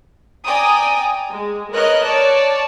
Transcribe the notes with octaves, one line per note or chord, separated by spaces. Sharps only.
D5 G5 G#5 A#5 D#6
G#3
A#4 B4 C#5 D#5 F#6
C#5 D5 A5